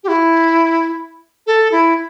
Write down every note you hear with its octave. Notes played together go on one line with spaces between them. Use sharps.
G4
E4
A4
E4